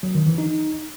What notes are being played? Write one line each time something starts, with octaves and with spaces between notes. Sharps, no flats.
F#3
D#3
E3
D#4